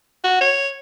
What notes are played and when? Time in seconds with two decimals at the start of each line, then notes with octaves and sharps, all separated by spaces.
0.24 F#4
0.41 C#5